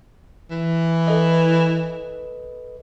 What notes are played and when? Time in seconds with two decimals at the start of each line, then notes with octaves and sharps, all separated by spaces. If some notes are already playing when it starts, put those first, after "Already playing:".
0.51 E3
1.07 A4 B4 D#5